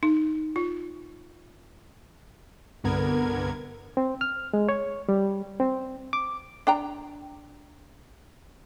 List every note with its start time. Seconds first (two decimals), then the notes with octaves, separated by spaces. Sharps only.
0.03 D#4
0.56 F4
2.84 C2 G2 D3 B3 A#4 G#6
3.97 C4
4.21 F6
4.54 G#3
4.69 C#5
5.09 G3
5.60 C4
6.13 D6
6.67 D4 G5 A#5